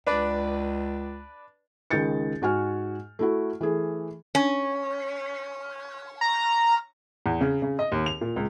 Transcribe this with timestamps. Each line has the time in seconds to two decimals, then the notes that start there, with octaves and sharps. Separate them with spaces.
0.07 C#2 D4 B4 D5
1.90 C#2 D#3 G#4 G6 A6 C#7
2.42 G#2 F#4 G#5 F6
3.19 A3 E4 F#4
3.61 E3 A3 G#4
4.35 C#4
6.21 A#5
7.26 E2
7.41 C#3
7.62 C#3
7.79 D#5
7.92 D#2
8.06 F7
8.21 A#2
8.36 C#2